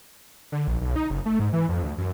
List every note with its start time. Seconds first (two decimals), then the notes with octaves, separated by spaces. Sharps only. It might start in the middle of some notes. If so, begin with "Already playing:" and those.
0.52 D3
0.67 A#1
0.81 B1
0.96 D#4
1.10 F#1
1.26 A3
1.39 G#2
1.53 E3
1.69 F2
1.83 D2
1.98 F#2